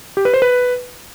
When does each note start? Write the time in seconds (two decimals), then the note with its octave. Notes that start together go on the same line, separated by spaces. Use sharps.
0.17 G4
0.25 B4
0.34 C5
0.42 B4